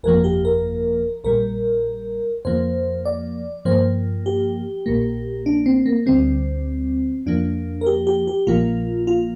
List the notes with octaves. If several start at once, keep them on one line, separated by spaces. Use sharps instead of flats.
G1 F2 F3 A#3 A#4
G4
A#4
A#1 A#2 G3 A#4
F2 F3 A#3 C5
D5
G2 F3 A#3 C5
G4
A#1 A#2 A#3
D4
C4
A#3
D2 D3 G3 C4
F2 F3 A#3 D4
A#4
G4
G4
G4
A#1 A#2 F3 A#3 F4
F4